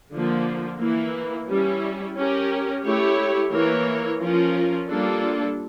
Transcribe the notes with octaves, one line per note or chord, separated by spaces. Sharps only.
D3 F3 A#3
E3 A#3 E4
G3 C#4 E4
C#4 G4 A#4
A3 E4 G4 C#5
E3 A#3 E4 A#4 C#5
F3 C#4 F4 A#4
G3 A#3 D4 F4 A4